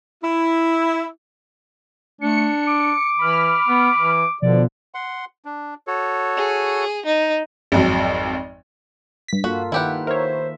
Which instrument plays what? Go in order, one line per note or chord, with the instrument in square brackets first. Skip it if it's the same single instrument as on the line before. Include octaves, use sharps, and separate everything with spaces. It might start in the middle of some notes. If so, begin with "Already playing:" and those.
[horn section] E4
[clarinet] A3 [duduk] D4 [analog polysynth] C#7
[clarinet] D6
[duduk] E3 [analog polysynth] B5 F6
[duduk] B3
E3
[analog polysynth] B2 F3 [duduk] D3 [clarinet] D5
[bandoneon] F#5 C6
D4
F#4 A4 C#5
[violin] G#4
D#4
[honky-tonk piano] G#1 F2 F#3
[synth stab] G2 B6
[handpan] A#3 F4 A4 [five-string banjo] F#4
[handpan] D#3 B4 [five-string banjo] E4 G4 F#5
[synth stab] A#4 C#5 [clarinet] C5 [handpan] E5